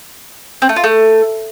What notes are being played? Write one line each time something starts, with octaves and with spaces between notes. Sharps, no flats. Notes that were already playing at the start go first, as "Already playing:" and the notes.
C4
A3
F4
A3